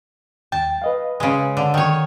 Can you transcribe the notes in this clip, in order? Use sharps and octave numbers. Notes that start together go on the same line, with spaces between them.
D#2 G5 A5
B4 D#5 F5
C#3 G#3
D3
D#3 C#5